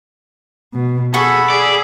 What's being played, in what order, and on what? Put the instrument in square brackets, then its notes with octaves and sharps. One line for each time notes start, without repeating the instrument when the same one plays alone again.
[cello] B2
[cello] G#4 [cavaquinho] A4 F#5 C#6 [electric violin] B5 E6
[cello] G#4 [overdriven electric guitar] D5